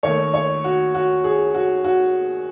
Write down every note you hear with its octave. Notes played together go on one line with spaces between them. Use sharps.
D#2 D#3 A3 C#5
C#5
F#4
F#4
G#4
F#4
F#4